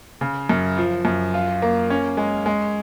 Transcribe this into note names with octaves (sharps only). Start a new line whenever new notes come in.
C#3
F#2
F3
F#2
F4
A#3
C#4
G#3
G#3